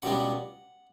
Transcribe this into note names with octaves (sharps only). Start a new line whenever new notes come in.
C#2 B2 G3 B3 D4 F#5